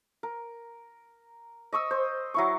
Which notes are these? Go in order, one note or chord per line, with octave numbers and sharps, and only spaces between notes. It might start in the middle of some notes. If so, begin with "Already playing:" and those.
A#4
D#5 C#6 D#6 E6
C5
F#3 E4 C#6